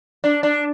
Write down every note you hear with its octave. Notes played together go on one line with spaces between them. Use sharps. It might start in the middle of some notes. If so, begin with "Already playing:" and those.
D4
D4